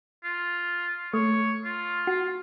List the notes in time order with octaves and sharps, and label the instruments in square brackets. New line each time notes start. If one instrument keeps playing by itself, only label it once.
[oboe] F4
[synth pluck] A3 [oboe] C#5
[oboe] F4
[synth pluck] F#4